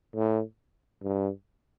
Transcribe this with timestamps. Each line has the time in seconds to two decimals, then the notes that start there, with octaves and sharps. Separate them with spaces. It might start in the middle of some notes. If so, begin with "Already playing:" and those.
0.15 A2
1.03 G2